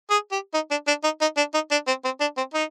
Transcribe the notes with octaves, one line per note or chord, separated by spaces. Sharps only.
G#4
G4
D#4
D4
D4
D#4
D#4
D4
D#4
D4
C4
C4
D4
C4
D#4